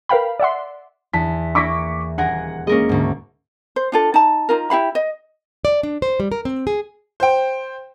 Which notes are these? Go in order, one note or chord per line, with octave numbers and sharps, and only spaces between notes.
A#4 B4 F5 G5 B5
D5 E5 F#5 C6
E2 A5 B6
A#3 E4 A#4 C#6 D6 B6
D#1 G#4 A#4 F#5
G#3 A#3 C#4 A#4 D#5
D2 G#2
C5
D4 F4 A4
D#4 A5
D#4 F4 A#4
E4 G4 F5 B5
D#5
D5
D4
C5
G3
A#4
C4
G#4
C5 G5